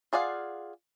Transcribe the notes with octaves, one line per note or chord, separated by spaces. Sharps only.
F4 G#4 D5 F5 F#5